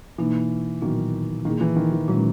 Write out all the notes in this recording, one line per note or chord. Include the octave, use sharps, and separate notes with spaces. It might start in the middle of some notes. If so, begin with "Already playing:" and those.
B2 E3 A#3 D#4
A#2 D#3 F#3 B3 F#4
A#2 D#3 A#3 E4 G#4
E3
D#3
E3
A#2 F#3 G#3 C#4